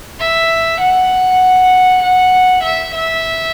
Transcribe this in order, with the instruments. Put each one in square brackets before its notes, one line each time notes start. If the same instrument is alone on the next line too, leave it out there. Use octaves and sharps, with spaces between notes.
[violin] E5
F#5
F#5
E5
E5